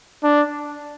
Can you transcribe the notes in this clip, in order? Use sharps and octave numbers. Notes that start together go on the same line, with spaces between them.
D4